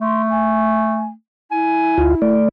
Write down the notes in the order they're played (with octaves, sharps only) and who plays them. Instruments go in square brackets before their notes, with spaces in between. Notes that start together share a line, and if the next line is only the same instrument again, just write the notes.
[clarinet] A3 [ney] C6
[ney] G#5
[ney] E4 [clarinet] G#5
[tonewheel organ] D2 F4
A3 D5